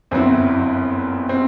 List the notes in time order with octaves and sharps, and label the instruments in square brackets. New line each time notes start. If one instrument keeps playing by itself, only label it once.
[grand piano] G1 F#2 F#3 B3 E4 [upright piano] C4
[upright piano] C4